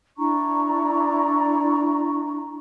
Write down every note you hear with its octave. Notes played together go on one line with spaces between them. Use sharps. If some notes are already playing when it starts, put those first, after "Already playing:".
D4 E4 A#5 C#6